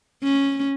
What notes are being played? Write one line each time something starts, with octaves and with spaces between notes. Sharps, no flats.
C#4